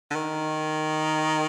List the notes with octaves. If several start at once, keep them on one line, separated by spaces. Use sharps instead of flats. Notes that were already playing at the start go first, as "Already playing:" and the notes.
D3
D#3